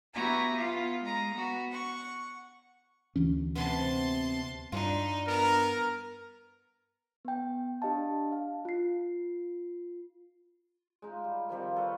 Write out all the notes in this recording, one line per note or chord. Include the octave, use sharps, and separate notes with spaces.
B3 E4 F#4 G4 G#5 A#5
B3 F4
G#3 A#5
B3 F#4
F#5 C#6
D2 E3 C#4
C3 B3 A5 C6
G2 D4 D#4 F4
B3 A#4 A#5
B3 G5
D4 G4 D#5 F5 A5
F5
F4 C7
G#3 D#4 F4
G3
D#3 F3 G3 C4
A4 B4 C#5 F5